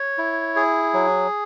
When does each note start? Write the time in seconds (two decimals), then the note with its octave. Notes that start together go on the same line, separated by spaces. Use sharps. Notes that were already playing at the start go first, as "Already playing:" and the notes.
Already playing: C#5
0.18 E4
0.56 G#4
0.94 F#3